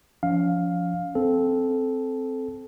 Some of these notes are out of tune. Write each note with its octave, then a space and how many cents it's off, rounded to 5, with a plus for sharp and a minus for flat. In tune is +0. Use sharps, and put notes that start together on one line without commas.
F3 +0 C#4 +45 F5 +10
C4 +0 A4 -15